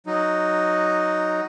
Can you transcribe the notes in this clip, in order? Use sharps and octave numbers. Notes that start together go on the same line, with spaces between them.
F#3 D#4